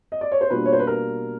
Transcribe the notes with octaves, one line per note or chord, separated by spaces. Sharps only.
D#5
D5
C#5
C5
B2 G3 A#3 D4 F4 B4
C#5
C5
B4
A#4